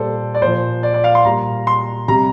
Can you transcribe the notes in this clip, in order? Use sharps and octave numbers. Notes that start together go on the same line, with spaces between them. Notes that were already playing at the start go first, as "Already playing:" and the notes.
Already playing: A#2 G3 A4 C5 D5
D5
A#2 F3 C5
D5
D5
F5
C6
A#2 G3 A#5
C6
C3 G3 A#5